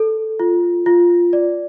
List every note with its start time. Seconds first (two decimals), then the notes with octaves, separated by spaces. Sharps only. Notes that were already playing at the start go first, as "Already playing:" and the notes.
Already playing: A4
0.40 F4
0.86 F4
1.33 D5